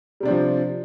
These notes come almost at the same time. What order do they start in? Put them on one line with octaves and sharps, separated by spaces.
G3 C3 D4 C4 F3